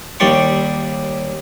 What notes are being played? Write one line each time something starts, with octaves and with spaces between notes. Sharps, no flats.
D#2 G3 D5 G5 C6 C#6